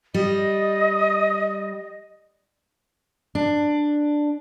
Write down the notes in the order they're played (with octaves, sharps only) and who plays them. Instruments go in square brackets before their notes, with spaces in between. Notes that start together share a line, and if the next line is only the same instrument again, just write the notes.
[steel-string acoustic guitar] G3 [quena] D#5
[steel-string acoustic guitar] D4